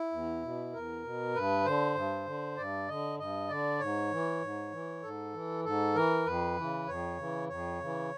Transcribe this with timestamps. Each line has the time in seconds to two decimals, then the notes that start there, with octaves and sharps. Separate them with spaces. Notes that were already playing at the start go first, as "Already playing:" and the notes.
Already playing: E4
0.12 E2
0.43 B2
0.73 E2 A#4
1.04 B2
1.34 G2 B4
1.65 D3 C5
1.95 G2
2.26 D3
2.57 G2 D5
2.88 D3 D#5
3.18 G2 D#5
3.49 D3 D5
3.80 G#2 C#5
4.11 E3
4.42 G#2
4.72 E3
5.03 G#2 A4
5.34 E3
5.65 G#2 A4
5.95 E3 A#4
6.26 F2 B4
6.56 C#3 E3
6.87 F2 C#5
7.18 C#3 E3
7.49 F2 C#5
7.80 C#3 E3